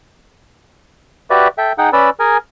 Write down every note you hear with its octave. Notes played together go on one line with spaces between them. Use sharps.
F#4 G4 B4 D5 E5
A4 E5 G5
D#4 G#4 F#5 G5
C#4 B4 D5 B5 E6
G#4 A#4 G#5